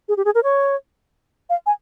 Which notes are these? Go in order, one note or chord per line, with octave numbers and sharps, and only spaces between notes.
G#4
G4
G#4
A#4
C#5
F5
G#5